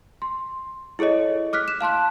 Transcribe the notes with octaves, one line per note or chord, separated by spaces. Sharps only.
C6
E4 G#4 A4 C#5 D#5
D6 F6 F#6 B6
E7
F5 A5 C6 F#6